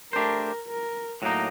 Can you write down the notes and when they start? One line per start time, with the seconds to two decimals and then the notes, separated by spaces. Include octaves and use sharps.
0.13 A3 D4 G4 A#4 C5
0.68 A#4
1.22 A2 F#3 A#3 D#4